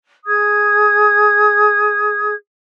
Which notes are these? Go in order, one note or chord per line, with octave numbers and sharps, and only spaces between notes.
G#4 D#6 G#6